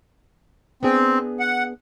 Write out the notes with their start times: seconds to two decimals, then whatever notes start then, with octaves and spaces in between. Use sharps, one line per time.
0.83 B3 C4 D4 G#4
1.40 F#5